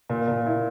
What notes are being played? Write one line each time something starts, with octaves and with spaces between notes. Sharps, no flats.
A#2
A#2
E4